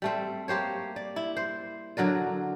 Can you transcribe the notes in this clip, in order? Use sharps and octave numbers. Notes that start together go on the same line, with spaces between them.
G3 A3 C4
A#3 G4 C5 C#5
D5
E4
C5
D3 F#3 A#4 D5